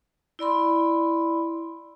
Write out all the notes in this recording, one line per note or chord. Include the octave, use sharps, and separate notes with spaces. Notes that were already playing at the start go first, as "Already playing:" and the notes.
E4 D5 B5 C6